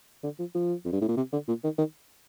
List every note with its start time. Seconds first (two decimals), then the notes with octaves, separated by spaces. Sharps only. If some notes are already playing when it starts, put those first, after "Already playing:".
0.24 D3
0.39 F3
0.55 F3
0.85 F2
0.92 G2
1.01 A2
1.08 A#2
1.17 C3
1.32 D3
1.48 A#2
1.64 D#3
1.78 D#3